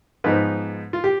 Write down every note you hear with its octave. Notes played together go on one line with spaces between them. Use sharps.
G#2 F3 B3 D#4 B4
F4
G4